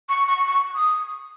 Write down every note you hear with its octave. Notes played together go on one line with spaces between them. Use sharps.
C#6
C#6
C#6
D#6